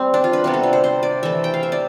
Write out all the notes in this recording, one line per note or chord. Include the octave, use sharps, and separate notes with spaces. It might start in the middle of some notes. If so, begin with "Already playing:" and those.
Already playing: G3 C4
D4
F4
B4
C3 G3 B3
A4
B4
C5
C5
D5
E3 A3 E5
G5
F5
E5
D5